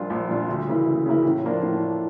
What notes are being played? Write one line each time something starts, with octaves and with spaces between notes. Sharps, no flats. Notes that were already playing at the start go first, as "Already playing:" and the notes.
Already playing: A#1 A#2 G3 D4 F4
A#1
A#2 G3 D4 F4
D2
C#3 E3 A#3 E4
D2
C#3 E3 A#3 E4
A2
F3 A#3 D4 F4
A2